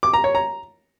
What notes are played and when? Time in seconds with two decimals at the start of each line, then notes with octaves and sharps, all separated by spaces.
0.03 D6
0.13 A#5
0.24 C#5
0.35 A#5